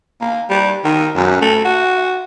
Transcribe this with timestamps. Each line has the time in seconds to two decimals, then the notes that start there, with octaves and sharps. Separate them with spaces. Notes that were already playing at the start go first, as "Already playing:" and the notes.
0.21 A#3
0.50 G3
0.84 D#3
1.16 F#2
1.41 A3
1.64 F#4